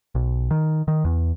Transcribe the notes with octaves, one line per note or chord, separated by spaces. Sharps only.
B1
D#3
D#3
E2